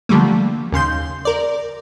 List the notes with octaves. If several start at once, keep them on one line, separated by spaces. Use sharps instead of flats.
D3 F3 G3 A3 A#3
D#2 C#3 C6 G6
A#4 D5